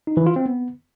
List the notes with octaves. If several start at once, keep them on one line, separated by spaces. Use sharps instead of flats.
D#4
E3
F4
C4
B3